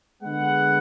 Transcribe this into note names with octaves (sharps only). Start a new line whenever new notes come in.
D3 G#3 B3 F#5